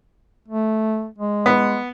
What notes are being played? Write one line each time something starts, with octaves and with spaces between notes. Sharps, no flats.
A3
G#3
B3